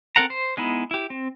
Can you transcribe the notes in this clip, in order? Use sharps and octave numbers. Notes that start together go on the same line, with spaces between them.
C4 A4 A#4 F#5 A#5
C5
G#3 B3 D#4 E4
E4 G4
C4